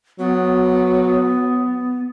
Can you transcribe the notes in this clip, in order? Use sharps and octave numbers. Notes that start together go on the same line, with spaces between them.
F#3 B3